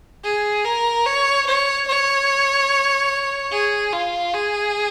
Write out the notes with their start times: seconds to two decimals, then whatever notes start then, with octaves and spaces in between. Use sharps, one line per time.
0.25 G#4
0.65 A#4
1.06 C#5
1.47 C#5
1.88 C#5
3.52 G#4
3.93 F4
4.34 G#4